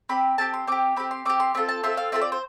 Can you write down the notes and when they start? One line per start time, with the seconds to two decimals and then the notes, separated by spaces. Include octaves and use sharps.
0.09 C4 G4 B5
0.38 C4 G4 A5
0.54 C6
0.67 C4 G4 D6
0.96 C4 G4 B5
1.11 C6
1.25 C4 G4 D6
1.40 C6
1.55 C4 F4 A4 B5
1.69 A5
1.83 C4 F4 A4 E5
1.97 F5
2.12 C4 F4 A4 E5
2.22 D5
2.32 C5